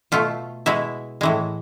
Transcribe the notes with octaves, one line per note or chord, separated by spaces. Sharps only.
B2 A3 F4
B2 G#3 E4
A2 E3 G#3